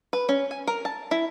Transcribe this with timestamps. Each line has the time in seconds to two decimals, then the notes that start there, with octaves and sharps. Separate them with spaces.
0.13 B4
0.29 C#4
0.51 G#5
0.68 A#4
0.85 A5
1.11 E4